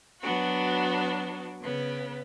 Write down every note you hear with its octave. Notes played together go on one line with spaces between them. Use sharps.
F#3 B3 D4 F#4
C#3 B3